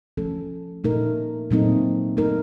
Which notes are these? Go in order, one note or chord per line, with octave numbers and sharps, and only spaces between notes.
F3 A3 C#4 A4
A#2 A3 D#4 A#4
A#2 F#3 A3 C4 D#4
A3 D#4 A#4